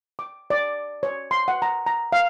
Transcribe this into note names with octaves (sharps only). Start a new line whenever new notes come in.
D6
D5
C#5
C6
F#5
A#5
A#5
F5